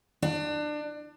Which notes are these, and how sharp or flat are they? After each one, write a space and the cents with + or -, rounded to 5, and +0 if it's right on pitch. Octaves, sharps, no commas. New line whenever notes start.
D4 +25